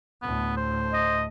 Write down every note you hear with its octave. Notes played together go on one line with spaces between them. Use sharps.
D2 A2 B3
C5
D#5